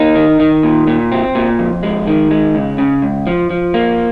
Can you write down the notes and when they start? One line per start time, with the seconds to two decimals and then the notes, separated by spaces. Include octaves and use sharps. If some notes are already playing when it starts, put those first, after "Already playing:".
Already playing: A#3 D#4
0.15 D#3
0.40 D#3
0.63 A#2
0.87 A#2
1.12 C4
1.35 A#2
1.59 F2
1.83 G#3
2.07 D#3
2.31 G#3
2.55 C#2
2.78 C#3
3.02 C#2
3.27 F3
3.50 F3
3.74 A#3